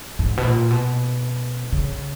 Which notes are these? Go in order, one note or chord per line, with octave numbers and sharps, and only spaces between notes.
G#2
B2
A#2
B2
C#3